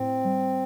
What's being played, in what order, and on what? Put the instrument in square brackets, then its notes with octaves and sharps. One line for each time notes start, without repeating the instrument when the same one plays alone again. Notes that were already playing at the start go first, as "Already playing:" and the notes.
Already playing: [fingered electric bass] A2 [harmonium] C4
[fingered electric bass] G3